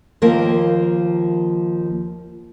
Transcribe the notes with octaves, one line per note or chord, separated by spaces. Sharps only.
D#2 F3 A#3 A#4